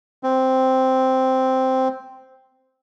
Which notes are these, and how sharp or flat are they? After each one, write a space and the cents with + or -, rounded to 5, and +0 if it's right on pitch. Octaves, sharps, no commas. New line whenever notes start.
C4 -5